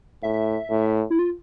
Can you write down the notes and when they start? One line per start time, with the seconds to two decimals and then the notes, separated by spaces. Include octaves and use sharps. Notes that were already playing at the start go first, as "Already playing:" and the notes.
0.23 A2 E5
0.70 A2
1.10 E4
1.19 F4